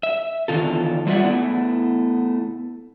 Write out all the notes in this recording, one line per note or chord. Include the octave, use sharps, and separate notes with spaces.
E5
E2 G2 D3 D#3 F4 A4
G3 A3 F4 D5 E5 F#5
A3 B3 E4